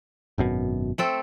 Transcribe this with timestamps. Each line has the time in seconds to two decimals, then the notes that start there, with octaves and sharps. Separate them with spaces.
0.38 G#1 F#2 B2
0.98 A3 C4 A4